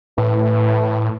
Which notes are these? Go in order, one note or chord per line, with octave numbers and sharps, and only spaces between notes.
A2 E3